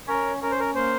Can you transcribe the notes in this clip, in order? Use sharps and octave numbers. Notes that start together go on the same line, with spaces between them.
C#4 A#4
C#4 A#4
C5
A#4
A#3 C5